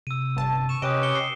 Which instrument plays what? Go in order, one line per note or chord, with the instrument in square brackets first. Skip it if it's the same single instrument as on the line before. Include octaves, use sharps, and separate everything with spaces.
[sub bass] C3 [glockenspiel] E6 D#7
[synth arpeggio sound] G1 G2 A5
[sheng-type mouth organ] C#6 [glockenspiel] E7
[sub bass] C3 [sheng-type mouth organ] C#4 G4 B4 [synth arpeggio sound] D#5 [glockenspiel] D#6 D7
[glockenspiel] C#7 G7
C7